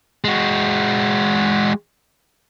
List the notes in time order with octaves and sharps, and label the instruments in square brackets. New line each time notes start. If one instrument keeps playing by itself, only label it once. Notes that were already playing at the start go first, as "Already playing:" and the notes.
[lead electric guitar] G#3 F#4